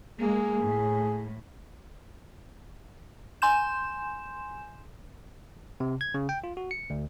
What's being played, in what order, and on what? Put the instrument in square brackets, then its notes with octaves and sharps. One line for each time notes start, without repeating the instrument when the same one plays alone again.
[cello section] G#3 A#3 [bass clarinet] G#4
[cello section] A2
[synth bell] G#5 C6 G6 E7
[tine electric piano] C3
G#6
C#3
G5
F4
F#4
C#7
D2